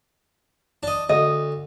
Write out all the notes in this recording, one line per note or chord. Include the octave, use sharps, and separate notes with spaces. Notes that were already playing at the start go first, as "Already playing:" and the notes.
D4 D#5
D2 D#5